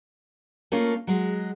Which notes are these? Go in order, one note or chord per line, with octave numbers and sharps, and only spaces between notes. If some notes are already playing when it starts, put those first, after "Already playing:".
A3 A#3 C#4 F4
F#3 G#3